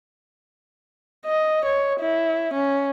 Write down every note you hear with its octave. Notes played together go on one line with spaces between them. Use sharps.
D#5
C#5
E4
C#4